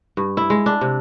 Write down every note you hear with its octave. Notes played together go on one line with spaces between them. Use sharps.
G2
E4
G#3
D4
C3